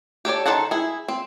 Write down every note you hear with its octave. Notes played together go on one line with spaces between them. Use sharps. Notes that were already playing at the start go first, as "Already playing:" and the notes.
G4 A4 C#5 D5
D#3 A4 C5 F#5 A5
E4 G#4
C4